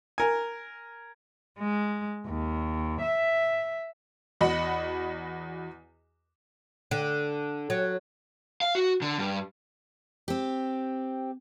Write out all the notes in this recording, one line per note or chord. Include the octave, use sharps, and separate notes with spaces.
A#4 G#5
G#3
D#2
E5
E2 F#4 D#5 B5 C#7
D3
F#3
F5
F#4
D3
G2
C4 G4